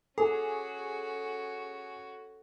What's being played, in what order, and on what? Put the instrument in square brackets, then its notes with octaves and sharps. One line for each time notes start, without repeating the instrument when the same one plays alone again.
[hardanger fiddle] C#4 F#4 [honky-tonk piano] G#4 [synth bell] A4